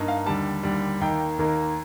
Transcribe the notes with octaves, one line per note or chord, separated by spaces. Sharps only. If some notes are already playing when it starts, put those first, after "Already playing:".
Already playing: G2 A#3 D#4
F5
D#2 D3 G3 A5
D#2 D3 G3
D#2 D#3 A#3 D#4 G5
D#2 D#3 A#3 D#4